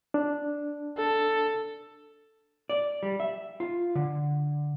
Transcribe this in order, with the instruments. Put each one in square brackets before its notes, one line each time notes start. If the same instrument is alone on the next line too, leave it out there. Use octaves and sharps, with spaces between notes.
[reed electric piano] D4
[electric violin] A4
[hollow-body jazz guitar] D5
G3
E5
F4
D3